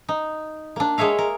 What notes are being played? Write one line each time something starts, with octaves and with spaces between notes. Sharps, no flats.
D#4
A#3 D4
G#3 G#4 C#5 E5 F5
A#4